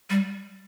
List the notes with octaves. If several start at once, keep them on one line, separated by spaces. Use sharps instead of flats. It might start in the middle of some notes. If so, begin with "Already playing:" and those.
G3